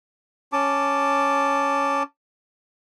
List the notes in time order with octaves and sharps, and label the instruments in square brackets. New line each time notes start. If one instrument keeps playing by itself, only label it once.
[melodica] C#4 A5 D6